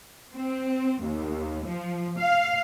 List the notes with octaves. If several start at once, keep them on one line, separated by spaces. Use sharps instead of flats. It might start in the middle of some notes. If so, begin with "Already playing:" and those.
C4
D#2
F3
F5